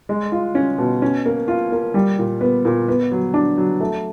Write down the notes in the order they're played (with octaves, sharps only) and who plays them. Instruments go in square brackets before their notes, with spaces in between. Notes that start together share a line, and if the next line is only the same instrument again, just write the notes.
[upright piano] G#3
F4
C#4
B2
C#4
A#3
F4
A#3
G3
A#2
B3
A#2
B3
F#3
D4
F#3
A3